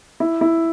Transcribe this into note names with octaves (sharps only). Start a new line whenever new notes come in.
E4
E4